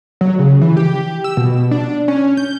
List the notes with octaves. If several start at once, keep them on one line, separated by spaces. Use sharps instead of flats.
F#3
C#3
E3
G4
E6
B2
D4
C#4
G6